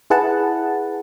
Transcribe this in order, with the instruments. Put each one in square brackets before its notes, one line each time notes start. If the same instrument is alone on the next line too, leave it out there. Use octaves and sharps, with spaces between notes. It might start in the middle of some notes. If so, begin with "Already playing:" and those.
[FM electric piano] E4 G#4 B4 F#5 A5